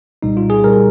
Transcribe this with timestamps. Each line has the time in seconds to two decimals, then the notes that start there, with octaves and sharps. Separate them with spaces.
0.22 C2 A#2 G3 D#4
0.37 F4
0.50 G#4
0.64 A#2 G3 A#4